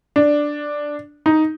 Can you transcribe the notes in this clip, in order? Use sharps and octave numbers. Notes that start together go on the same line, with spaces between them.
D4
D#4